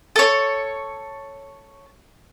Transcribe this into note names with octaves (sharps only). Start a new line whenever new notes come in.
A4 C#5